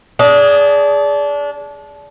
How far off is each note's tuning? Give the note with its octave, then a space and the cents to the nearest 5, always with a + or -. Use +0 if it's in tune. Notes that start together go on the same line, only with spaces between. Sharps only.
D4 -25 G#4 +0 D#5 +15